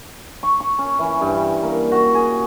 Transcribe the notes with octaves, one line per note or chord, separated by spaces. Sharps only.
C#6
C#6
C#4
E3
G2
G3
A#3
F#4
G#4